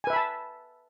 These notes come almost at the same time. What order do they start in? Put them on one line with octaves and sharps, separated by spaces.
G#5 B4 E5 B5 A5